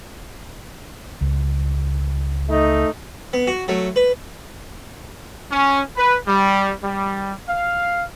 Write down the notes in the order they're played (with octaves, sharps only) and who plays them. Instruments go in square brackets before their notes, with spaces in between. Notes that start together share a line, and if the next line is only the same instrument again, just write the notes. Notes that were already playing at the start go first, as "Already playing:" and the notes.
[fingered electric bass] C#2
[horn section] A3 D#4
[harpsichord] B3
F#4
F#3 A3
B4
[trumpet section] C#4
B4
G3
G3
F5